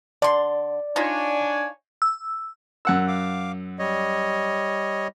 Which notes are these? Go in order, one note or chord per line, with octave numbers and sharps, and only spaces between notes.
D3 D5 C6
D4 D#4 F4 C#5 G#5
E6
F#2 F#5 E6
F5 D6
G3 C#5 D#5